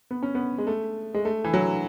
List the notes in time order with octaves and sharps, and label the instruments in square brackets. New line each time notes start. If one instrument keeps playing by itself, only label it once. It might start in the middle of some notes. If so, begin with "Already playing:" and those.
[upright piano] B3
C#4
B3
G#3
A3
G#3
A3
E3
F#3